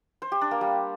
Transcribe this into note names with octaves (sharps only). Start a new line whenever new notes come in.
C5
G4
D4
A#3
G3